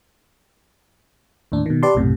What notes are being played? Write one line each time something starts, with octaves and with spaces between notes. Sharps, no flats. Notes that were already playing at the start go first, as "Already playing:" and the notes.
D#2 A2 D4
B2 D#3
G4 B4 D5 A5 C6
B1 F#2 A2 C3